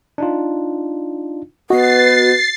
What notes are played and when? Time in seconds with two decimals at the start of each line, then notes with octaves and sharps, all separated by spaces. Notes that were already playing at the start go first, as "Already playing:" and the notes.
0.18 D4 D#4 F4
1.70 B3 F#4 B4 D#5 A6 C7